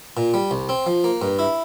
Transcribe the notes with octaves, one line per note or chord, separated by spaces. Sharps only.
A#2
G3
C2
C4
F3
A#3
G2
E4